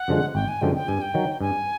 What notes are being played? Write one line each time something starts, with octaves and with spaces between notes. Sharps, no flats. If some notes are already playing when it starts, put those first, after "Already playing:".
Already playing: F#5
F#2 D3 F3 G#3
G#1 G5
G#5
F#2 D3 F3 G#3 G5
G5
G2 G#5
G5
D#3 F#3
G2 G#5